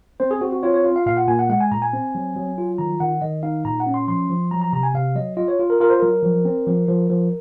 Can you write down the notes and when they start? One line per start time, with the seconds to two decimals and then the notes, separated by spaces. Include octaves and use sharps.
0.20 C4 C5
0.31 G#4
0.41 C4 F#4
0.52 F#4
0.63 F4 C#5
0.74 C#5
0.84 F4
0.96 F5
1.06 A#2 F5
1.17 F#5
1.27 A#2 G#5
1.39 F#5
1.50 G#3 F#5
1.61 G#5
1.72 A#2 A#5
1.82 G#5
1.93 C4
2.15 F#3
2.36 F#3
2.58 F4
2.78 D#3 A#5
3.00 D#3 F#5
3.22 D#3 D#5
3.43 D#4 F5
3.65 A#2 A#5
3.80 F#5
3.87 C#4
3.94 C6
4.08 F3 C6
4.29 F3
4.51 F#3 A#5
4.61 A#5
4.73 C3 A#5
4.83 G#5
4.94 C3 F5
5.16 F#3 D#5
5.37 F4 D#5
5.48 C#5
5.59 F4
5.70 A#4
5.80 F4 A#4
5.90 C5
6.00 F#3 A#4
6.23 F3
6.45 C4
6.67 F3
6.88 F3
7.10 F3